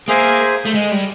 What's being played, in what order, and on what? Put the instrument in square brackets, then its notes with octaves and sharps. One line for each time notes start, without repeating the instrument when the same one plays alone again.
[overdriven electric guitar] A#3 [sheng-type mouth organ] G#4 C5 E5 G#5
[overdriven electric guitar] A3
G#3
G3